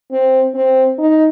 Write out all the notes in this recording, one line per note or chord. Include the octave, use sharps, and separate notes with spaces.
C4
C4
D#4